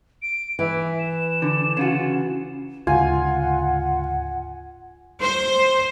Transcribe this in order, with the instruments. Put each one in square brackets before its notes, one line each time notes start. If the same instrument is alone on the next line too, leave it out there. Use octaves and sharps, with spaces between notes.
[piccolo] D7
[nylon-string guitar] E3 [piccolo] E5
[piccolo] E7
[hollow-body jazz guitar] D3
C#3 F4 F#4
[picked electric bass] D2 G#2 C#3 [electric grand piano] F4 [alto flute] F#5 [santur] G#5
[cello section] C5